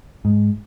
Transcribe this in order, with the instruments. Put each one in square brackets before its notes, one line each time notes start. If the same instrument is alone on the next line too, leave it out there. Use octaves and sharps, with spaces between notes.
[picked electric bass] G#2